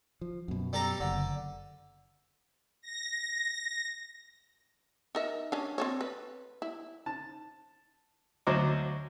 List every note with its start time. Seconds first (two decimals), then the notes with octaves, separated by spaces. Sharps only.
0.21 F3
0.48 F#2 B2
0.73 G3 A4 A#5
1.01 F#1 D3
2.81 A#6
5.15 D#4 A#4 E5
5.52 C#4 D4
5.78 C4 A4 C#5
6.01 B4
6.62 E4
7.06 A5
8.47 D2 F#3 C5 D#5 D6